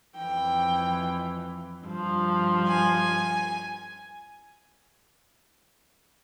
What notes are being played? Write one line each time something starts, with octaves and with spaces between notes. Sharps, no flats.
F2 E3 G5
G2 F3
G#5